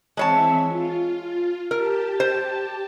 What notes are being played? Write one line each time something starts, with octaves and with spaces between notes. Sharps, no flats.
E3 G#3 C4 C#5 E5 A5
F4
G4 A#4 A5
C5